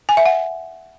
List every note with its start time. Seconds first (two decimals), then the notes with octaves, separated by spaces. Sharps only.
0.09 G#5
0.17 E5
0.26 F#5